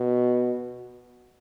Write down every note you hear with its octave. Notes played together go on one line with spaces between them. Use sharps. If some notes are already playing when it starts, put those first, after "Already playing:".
Already playing: B2